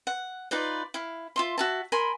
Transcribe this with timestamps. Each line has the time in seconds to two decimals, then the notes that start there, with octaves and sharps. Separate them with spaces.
0.07 F#5
0.51 D#4 F4 B4 D5
0.94 E4 F5
1.36 F4 E5 C6
1.58 F#4 E5 A5
1.92 A#4 G#5 B5 C6